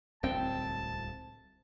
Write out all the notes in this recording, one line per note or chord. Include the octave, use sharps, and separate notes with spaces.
D1 C2 G#2 C4 G5 A5